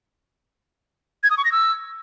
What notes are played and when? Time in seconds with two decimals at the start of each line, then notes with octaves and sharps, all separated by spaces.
1.23 G#6
1.31 D#6
1.38 C#6
1.45 A#6
1.52 E6